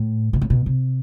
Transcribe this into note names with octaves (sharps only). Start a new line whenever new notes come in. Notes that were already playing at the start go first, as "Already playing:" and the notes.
Already playing: A2
B2
A2
B2
C3